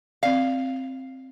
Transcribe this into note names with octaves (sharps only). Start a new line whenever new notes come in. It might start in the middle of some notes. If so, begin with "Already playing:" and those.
C4 D5 F5